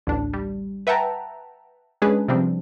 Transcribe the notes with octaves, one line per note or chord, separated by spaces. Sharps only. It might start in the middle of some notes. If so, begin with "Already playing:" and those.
A1 D2 D4
G3
B4 E5 F#5 G5 A5 A#5
G#3 C#4 D4 G#4 B4
C3 F3 G3 C4 D4